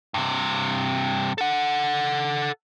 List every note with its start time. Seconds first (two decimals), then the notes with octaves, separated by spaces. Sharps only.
0.14 G2 C3
1.38 A4 F#5